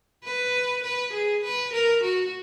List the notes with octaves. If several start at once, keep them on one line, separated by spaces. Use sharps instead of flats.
B4
B4
G#4
B4
A#4
F#4